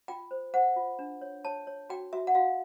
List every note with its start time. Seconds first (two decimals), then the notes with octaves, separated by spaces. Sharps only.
0.08 F4 G5
0.31 C5
0.54 C5 F#5
0.76 F4
0.99 D4
1.21 C#5
1.45 C#5 A5
1.67 C#5
1.90 F#4 G5
2.13 F#4 E5
2.27 F#5
2.35 F#4 F5